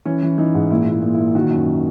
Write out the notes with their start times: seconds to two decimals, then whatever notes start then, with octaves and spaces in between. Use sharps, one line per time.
0.05 E3 C#4
0.23 E3
0.38 E3 D#4
0.55 G#2
0.70 A#2 E4
0.87 A#2 E4
1.02 A#2
1.14 A#2 E4
1.35 D#3 F#4
1.51 F#2